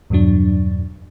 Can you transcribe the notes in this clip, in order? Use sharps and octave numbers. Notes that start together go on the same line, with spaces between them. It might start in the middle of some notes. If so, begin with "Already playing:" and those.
E2 G2 B2 F#3 D4